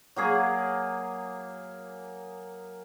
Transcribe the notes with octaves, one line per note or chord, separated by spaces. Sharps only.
F#3 A#3 G#4 D6